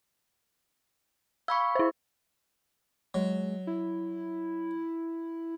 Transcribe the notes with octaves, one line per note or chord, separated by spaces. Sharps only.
F5 B5 C#6 E6
E4 C5
F#3 G#3
E4